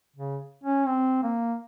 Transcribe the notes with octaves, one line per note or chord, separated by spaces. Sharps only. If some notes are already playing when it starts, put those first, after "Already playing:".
C#3
C#4
C4
A#3